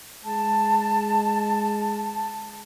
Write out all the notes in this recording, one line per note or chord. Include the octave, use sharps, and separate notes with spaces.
G#3 A5